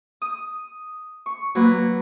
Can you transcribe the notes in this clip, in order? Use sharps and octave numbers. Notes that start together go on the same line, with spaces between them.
D#6
C#6
F#3 A#3 B4 F#5